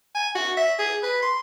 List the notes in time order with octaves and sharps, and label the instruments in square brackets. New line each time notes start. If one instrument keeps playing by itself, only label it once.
[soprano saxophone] G#5
F#4
E5
G#4
B4
C6